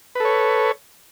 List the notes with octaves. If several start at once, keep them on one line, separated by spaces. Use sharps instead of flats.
A4 B4 C#5